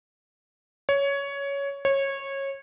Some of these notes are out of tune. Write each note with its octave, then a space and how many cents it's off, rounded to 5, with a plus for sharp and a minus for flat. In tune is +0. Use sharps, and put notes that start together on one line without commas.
C#5 +10
C#5 -20